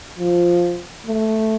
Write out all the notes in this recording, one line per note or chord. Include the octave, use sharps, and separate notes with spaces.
F3
A3